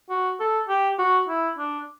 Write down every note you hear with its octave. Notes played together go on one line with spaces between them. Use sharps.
F#4
A4
G4
F#4
E4
D4